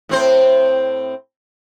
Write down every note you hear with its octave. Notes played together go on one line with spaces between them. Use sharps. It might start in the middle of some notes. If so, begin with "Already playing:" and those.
A2 C4 C5